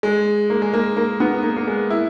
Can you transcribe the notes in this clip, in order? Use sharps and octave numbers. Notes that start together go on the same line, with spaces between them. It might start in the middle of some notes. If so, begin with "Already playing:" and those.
G#3
A#3
G#3
A#3
A#3
B3
A#3
A#3
G#3
E4